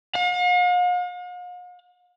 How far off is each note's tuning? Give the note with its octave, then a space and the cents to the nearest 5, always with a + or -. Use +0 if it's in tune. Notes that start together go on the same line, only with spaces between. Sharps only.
F5 +45